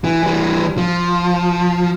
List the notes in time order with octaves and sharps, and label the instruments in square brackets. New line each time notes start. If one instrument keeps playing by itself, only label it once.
[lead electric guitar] E3
E3 G3
F3